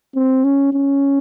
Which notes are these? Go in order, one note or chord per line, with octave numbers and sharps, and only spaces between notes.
C4
C#4
C#4